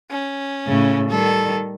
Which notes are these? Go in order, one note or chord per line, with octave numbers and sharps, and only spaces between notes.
C#4
A2 C#3
D#3 G3 A4